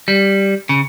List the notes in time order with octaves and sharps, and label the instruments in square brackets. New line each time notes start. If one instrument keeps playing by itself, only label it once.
[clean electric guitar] G3
C#3